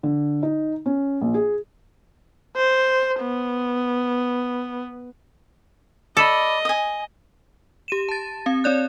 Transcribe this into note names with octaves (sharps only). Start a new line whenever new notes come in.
D3
D#4
C#4
A#1
G#4
C5
B3
A4 D5 D#5 B5
G#5 D#6
G4 D#7 E7
A5 A6
C4 F5
C4 C#5 D5 F#6